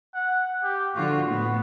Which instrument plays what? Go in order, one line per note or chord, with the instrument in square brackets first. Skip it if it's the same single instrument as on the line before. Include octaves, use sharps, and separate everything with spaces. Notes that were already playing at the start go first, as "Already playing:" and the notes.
[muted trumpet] F#5
G4
[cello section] D3 F3 F4 [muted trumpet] F#4
[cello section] A2 B3